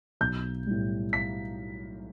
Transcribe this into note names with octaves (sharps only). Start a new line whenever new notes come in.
B1 G6
A2 G3
B6